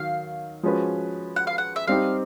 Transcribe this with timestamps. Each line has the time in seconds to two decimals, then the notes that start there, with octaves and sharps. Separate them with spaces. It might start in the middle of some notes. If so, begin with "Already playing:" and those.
Already playing: D#3 F#3 F5
0.63 F3 G#3 C#4 F#4 B4
1.36 F#5
1.47 F5
1.58 F#5
1.76 E5
1.87 G3 C4 D#4 G4 F5